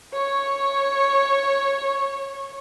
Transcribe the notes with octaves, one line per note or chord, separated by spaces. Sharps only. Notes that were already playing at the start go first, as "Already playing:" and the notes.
C#5 C#6